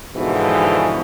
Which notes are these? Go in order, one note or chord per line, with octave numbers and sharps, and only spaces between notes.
G#2 B2 D3 E3 F3